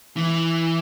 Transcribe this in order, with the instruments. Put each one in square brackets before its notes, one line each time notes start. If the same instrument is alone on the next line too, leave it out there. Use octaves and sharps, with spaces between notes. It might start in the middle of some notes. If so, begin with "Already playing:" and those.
[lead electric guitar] E3